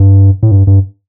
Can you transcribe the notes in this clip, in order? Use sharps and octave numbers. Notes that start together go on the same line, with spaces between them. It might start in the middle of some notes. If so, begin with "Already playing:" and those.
Already playing: G2
A2
G2
G2